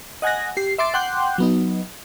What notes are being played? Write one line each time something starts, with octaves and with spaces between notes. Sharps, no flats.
D#5 F#5 G#5 F#6 A#6
G4 C7
E5 C6 D6 A6
F#5 G5 C6 D6 F#6 G6
F#3 B3 D#4